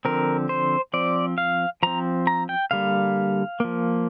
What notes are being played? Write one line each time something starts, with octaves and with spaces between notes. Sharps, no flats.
D3 F3 C4 A#4
C5
F3 C4 D5
F5
F3 C4 A#5
A#5
G5
D3 G3 A#3 F5
F3 A#3